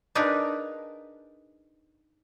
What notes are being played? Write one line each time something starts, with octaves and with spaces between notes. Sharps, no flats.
D4 D#4 F4 G#4 A#4 B4